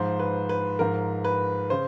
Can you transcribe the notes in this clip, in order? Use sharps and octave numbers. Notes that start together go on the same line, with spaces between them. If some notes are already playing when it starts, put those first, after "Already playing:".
Already playing: G#2 F3 C5
B4
B4
G#2 F3 A#4
B4
C#3 C5